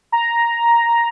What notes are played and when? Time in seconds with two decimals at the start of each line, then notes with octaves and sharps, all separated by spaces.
0.12 A#5